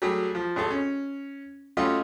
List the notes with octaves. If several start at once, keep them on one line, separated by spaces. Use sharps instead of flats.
F#3 G3 A3 G#4
F3
G#1 G#4 A4
C#4
G3 A3 C#4 F4 F#4 D#5